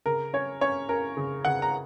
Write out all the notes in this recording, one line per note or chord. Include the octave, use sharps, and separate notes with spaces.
C#3 A#4
C#4 C#5
C#4 C#5
C#4 A#4
C#3
C#3 F#5
A#5